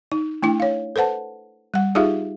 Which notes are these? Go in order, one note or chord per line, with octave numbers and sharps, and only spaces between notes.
D#4
A3 D4 E4 G5
C#5 F5
A4 B4 C5 F#5 A5
G3 F#5
D#4 F4 G4 G#4 E5 F5